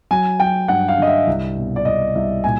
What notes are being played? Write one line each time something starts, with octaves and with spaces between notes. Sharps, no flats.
F#3 G#5
F#3 G5
G2 F#5
F5
D3 D#5
E5
C2
B2
D5
C2 D#5
C2 E5
A#2 G#5